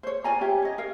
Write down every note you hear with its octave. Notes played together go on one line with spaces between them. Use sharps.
C5 C#5
F4 D5 G#5 A#5
C#4 G4 C#5 E5
C#5 D#5
A#4 F5